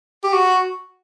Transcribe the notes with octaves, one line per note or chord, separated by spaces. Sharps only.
G4
F#4